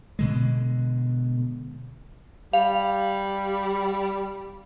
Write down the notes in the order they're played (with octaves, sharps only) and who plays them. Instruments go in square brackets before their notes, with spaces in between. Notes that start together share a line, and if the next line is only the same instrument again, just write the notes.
[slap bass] B2 D3 G#3
[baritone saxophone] G3 [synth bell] F5